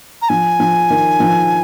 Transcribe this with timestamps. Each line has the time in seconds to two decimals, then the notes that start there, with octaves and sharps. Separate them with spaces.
0.22 A#5
0.29 F3 G#5
0.60 F3
0.90 D#3
1.20 F3